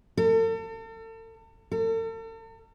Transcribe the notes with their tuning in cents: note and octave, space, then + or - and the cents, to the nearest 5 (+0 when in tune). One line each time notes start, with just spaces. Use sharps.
A4 +40
A4 +45